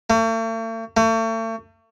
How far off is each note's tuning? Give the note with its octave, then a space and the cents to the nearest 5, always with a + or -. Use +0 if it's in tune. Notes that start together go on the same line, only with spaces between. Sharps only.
A3 +45
A3 +40